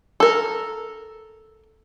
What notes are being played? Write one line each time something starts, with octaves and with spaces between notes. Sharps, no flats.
A4 A#4